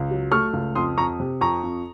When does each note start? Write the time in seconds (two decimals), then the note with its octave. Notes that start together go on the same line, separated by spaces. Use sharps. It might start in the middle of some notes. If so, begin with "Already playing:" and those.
Already playing: C#2
0.11 F#3
0.32 A3 C#6 F6
0.53 C#2
0.75 F2 C6 D#6
0.98 F2 A#5 C#6
1.20 C3
1.41 F2 A#5 C#6
1.63 F2